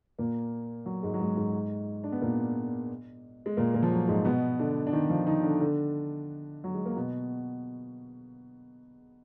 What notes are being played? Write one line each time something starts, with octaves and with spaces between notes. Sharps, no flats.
A#2 A#3
F#3
G#2 G#3
F#3
G#2 G#3
G#2 G#3
D4
B3
A#2 A#3
G#3
A#2 A#3
A#2 A#3
F3
F#3
G#2 G#3
B2 B3
D3 D4
D4
D#3 D#4
F3 F4
D#3 D#4
D3 D4
D3 D4
F#3
G#3
A#3
B2 B3